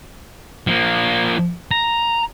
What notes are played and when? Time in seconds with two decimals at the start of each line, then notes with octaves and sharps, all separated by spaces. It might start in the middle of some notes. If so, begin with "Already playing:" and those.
0.67 F3 A#3
1.71 A#5